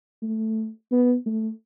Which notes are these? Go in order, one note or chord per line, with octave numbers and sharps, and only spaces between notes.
A3
B3
A3